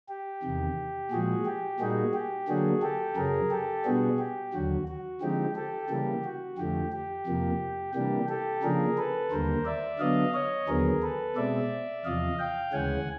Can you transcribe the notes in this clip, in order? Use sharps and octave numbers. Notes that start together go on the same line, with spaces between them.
G4
E2 C3 D#3
A#2 F3 G#3 F#4 G#4
G4
A#2 G3 A#3 D#4 F#4 G#4
G4
D3 F#3 A#3 D4 F#4 G#4
G4 A4
F#2 C#3 F#3 G#4 A#4
G4 A4
B2 G3 B3 D4 F#4 G#4
G4
D#2 D3 F#3 F#4
F#4
D3 F3 G#3 C4 D#4 G4
G4 A4
C#3 E3 G3 A#3 G4
F#4
F2 D3 F3 A3 G4
G4
F2 C3 F3 A#3
C3 E3 G3 A#3 D4 G4
G4 A4
C#3 F3 A#3 D4 G#4 A#4
A4 B4
D#2 D3 G3 A#3 A#4 C5
D5 E5
D3 F#3 B3 D4 D#5 F5
C#5 D#5
D#2 D3 F#3 B3 G#4 A#4
A4 B4
B2 G#3 C4 D5 E5
E2 C3 F3 D#5 F5
F5 G5
D2 C#3 E3 G#3 C#4 F#5 G#5